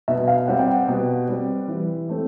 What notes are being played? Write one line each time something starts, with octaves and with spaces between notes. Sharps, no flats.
B2 E5
F5
G3 C4 F#5
G5
F#5
B2
G3 C4
E3
A3 C4